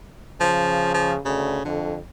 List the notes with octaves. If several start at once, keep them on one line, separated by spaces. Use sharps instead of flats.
C#3 F3
F3
D2 C#3
F2 D3